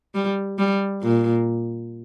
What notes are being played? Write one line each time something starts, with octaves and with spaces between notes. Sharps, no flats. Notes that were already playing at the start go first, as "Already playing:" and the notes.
G3
G3
A#2